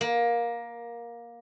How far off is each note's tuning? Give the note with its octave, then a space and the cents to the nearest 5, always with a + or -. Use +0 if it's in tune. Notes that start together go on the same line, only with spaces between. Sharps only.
A#3 +15